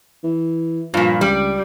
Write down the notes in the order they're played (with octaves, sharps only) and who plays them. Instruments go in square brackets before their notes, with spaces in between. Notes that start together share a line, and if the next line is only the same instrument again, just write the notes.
[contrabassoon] E3
[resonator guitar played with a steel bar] G2 A#2 [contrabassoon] F3
[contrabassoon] C#2 [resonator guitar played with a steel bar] G3